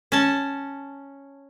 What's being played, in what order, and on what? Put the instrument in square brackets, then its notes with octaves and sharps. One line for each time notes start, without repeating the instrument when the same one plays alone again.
[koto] C#4 A5